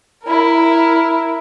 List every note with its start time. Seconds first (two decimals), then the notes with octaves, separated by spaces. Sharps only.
0.24 E4 A#4